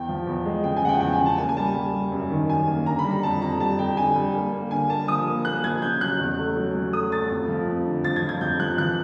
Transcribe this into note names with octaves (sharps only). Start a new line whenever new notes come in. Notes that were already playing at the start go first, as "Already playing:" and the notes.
Already playing: E2 G5
F3
E2
G#3
C#3 G5
G#5
F3 F#5
G5
E2 G5
G#5
C#3
A5
A#3 G#5
G#5
G3 A5
G3
G3
F#2
D#3
F#2 G#5
A#3
D3 A#5
B5
G3
A#5
F2 A5
F2 A#5
G3 A5
F2 G5
D3 G#5
G3
A#3
A#3
D3 G#5
A#3 A5
F3 D#6
A#3
A#3 F#6
F3 G#6
C#3 G6
F#3 F#6
E2
A3
F#3
F#3
A3 D#6
A3 A6
F2
F3
F2
D3
F3 A6
G#6
F3
G#6
F2 G6
F3 F#6
E3 F#6